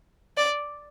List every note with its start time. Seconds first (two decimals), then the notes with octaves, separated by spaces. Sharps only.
0.37 D5